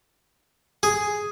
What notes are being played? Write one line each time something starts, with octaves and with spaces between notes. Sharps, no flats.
G#4